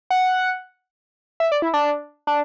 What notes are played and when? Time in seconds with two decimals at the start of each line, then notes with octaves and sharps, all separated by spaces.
0.10 F#5
1.40 E5
1.52 D5
1.62 E4
1.74 D4
2.27 D4